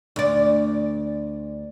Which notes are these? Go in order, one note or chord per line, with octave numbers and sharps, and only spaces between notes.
D2 D5